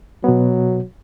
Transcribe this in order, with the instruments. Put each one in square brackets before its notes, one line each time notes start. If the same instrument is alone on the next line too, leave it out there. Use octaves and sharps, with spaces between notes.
[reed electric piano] B2 B3 [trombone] F#3